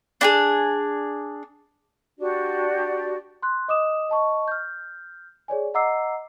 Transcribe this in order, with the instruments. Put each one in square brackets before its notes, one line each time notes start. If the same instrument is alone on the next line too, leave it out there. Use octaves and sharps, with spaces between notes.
[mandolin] D4 G4 G#4
[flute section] D4 F#4 G4 D5
[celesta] C6 F#6
D#5 D6 D#6 E7
D#5 A5 C#6
F6 G6
G#4 C#5 D5 G#5
D#5 F#5 A#5 D6 E6 C7